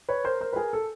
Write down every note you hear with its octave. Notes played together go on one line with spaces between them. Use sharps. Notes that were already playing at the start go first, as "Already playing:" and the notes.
B4 C#5
A#4 C5
A#4 C5
B4
G#4 A#4
A4